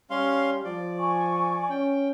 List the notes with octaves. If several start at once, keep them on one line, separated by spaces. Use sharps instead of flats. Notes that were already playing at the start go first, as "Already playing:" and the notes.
G3 C#4 F5 C6
F3 D5
G#5 C#6
C#4 G5